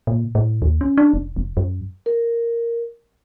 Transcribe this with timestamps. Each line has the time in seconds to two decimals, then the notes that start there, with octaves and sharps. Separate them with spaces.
0.07 A#2
0.35 A2
0.62 D#2
0.81 C#4
0.97 D4
1.14 F1
1.36 F1
1.57 F#2
2.06 A#4